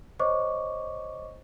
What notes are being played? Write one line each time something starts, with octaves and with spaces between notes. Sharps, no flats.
C5 C#5 D#5 C#6 D6